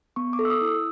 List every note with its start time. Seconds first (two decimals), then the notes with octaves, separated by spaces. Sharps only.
0.16 B3 C#6
0.33 D6
0.39 A4
0.45 E6
0.50 D#6
0.61 E4
0.66 E6